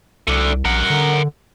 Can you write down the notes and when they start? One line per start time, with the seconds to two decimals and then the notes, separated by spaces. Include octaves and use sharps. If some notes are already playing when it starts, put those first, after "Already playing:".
0.28 C2 A3 D4
0.65 A#1 A#4 F#5
0.90 D3